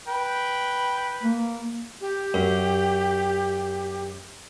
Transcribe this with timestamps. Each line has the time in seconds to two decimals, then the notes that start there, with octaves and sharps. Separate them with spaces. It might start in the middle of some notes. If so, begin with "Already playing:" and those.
0.08 B4 G5
1.23 A#3
2.01 G4
2.34 F#2